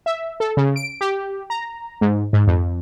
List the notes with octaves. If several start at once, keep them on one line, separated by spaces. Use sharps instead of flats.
E5
A4
C#3
D7
G4
A#5
G#2
G#2
F2